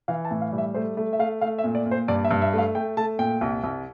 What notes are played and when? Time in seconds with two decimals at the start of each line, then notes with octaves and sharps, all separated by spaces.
0.08 E3 F5
0.25 A5
0.31 A2
0.42 F5
0.52 G3
0.58 E5
0.74 A3 C5
0.97 A3
1.13 E5
1.19 A3 F5
1.41 A3 F5
1.58 E5
1.64 A#2
1.75 D5
1.86 A#2
1.91 C5
2.08 G2 D5
2.25 E5
2.31 G2
2.42 E5
2.53 A3 F5
2.75 A3 G5
2.97 A3 A5
3.19 A#2 G5
3.41 C2
3.64 C2